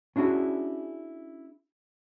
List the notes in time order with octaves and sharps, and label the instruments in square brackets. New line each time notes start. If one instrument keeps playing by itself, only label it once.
[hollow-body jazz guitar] C#4 D4 E4 F#4 G#4